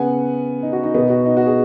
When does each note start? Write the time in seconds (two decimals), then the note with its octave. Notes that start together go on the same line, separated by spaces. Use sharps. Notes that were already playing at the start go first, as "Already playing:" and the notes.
Already playing: C#3 B3 F#5 G#5
0.63 D#4
0.73 F#4
0.83 D#4
0.95 B2 B3 D#4
1.10 F#4
1.26 D#4
1.37 F#4
1.46 G#4